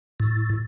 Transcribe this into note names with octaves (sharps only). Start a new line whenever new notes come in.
A2